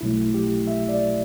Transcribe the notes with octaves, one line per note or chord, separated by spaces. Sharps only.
B1 B2 F#3 A3 E4
G4
E5
D5